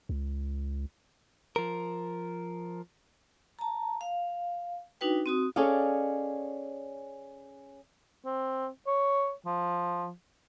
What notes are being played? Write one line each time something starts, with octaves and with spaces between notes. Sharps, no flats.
C#2
F3 A#4
A5 A#5
F5
D4 D#4 F#4 B4 G5
C4 F#4 D#6
C#4 G#4 A4 D5 D#5 F5
C4
C#5
F3